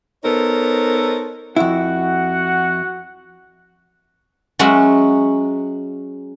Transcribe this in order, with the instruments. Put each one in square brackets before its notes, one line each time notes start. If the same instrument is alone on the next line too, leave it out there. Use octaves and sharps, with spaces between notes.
[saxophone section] B3 D#4 A4 A#4 C5 C#5
[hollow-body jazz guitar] F2 E4 [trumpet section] F#4 F#5
[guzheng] F#3 G#3 C#4 F#4 E5 F#5